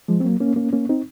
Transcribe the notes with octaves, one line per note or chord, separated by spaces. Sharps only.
F3 G#3
C4
F#3 A#3
A#3 C#4
A#3 C#4
A#3 C#4
C4 D#4